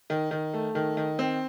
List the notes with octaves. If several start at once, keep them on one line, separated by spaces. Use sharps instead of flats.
D#3
D#3
A3
D#3
D#3
C4